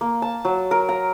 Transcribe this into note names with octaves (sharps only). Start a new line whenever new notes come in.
A#3
A5
F#3
A#4
A#5